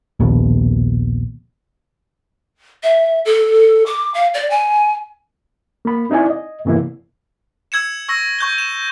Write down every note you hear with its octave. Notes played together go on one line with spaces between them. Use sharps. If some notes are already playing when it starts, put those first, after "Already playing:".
A#1 D#2 B2
E5
A4
D6
F5
D5
G#5
A#3 B5
C4 D#4 E4 D5 G#5
D#5
G2 C3 E3 A#3 B3 E4
E6 G#6 C#7 E7
C#6 E6 A#6
C#6 G6 G7
E7